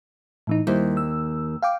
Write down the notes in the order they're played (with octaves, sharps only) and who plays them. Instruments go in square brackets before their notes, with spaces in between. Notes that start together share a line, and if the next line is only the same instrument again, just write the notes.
[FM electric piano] A2 E3 D#4
[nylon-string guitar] D#2 [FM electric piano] G3 E4 C5
[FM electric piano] E6
F5 G5 D6